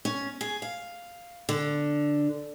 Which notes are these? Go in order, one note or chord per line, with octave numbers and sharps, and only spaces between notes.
C#4
G#4
F5
D3